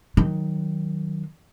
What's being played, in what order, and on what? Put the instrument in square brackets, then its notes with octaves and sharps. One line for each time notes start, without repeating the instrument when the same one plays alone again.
[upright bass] D#3 F#3